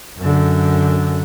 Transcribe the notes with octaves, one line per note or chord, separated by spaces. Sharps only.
F#2 D3